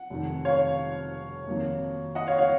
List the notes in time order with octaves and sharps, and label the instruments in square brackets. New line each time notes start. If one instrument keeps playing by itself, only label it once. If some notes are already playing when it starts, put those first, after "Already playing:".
Already playing: [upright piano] F#5
F1 F2 D#3
C#5 F5
F2 D#3 F#3 A#3
D#5 F#5
C#5 F5
C#5 F5